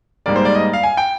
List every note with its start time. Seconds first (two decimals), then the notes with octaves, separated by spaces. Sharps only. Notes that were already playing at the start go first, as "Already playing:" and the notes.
0.26 G#2 G3 A#3 D5
0.36 C5
0.45 D5
0.55 D#5
0.73 F5
0.83 G#5
0.97 G5